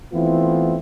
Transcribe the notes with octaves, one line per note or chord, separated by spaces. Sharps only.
E3 A3 B3 C4 E4 F4